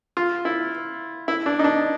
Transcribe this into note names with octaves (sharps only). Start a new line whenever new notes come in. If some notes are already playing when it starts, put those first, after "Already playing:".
F4
E4
E4
D4
D#4
D4